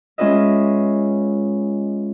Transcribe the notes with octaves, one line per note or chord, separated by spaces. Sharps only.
G#3 C#4 F4 B4 D#5 E5